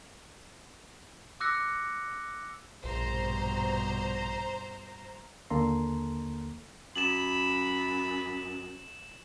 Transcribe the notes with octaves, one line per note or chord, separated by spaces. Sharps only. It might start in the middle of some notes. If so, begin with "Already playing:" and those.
D6 E6 F#6 A#6 C#7
A#1 G2 B2 C5 A#5
D#2 D3 A#3 A4 A#5 C6
F#2 B5 E7 F#7